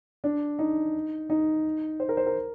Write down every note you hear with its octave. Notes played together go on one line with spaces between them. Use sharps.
D4
D#4
D#4
C5
A#4
C5
A#4